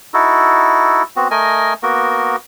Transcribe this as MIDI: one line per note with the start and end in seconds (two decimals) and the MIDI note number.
0.14 1.03 63
0.14 1.03 64
0.14 1.03 66
0.14 1.03 69
1.16 1.28 59
1.16 1.28 60
1.16 1.28 66
1.31 1.73 57
1.31 1.73 70
1.31 1.73 75
1.31 1.73 80
1.83 2.36 58
1.83 2.36 59
1.83 2.36 66
1.83 2.36 70